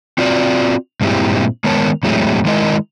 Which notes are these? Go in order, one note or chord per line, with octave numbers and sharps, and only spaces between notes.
C4 F4 F#4 D5
G2 A#2 G#3 C4 E4 G4
D#3 G#3 B3 A#4 C#5 A5
E2 A2 F#3 G#3 A3 C4
D#3 G#3 E4 A#4 D#5